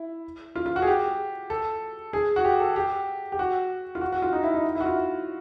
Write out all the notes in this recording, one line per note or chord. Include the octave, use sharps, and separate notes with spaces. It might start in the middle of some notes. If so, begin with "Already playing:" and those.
Already playing: E4
F4
F4
F#4
G#4
G4
A4
G#4
F#4
G4
A4
G4
G4
F#4
F4
F#4
F#4
F4
D#4
E4
D#4
E4
F#4
F4